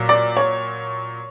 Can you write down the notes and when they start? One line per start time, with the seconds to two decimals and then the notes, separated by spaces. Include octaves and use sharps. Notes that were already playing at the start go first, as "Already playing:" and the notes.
Already playing: A#2 F#3
0.09 D5
0.37 C#5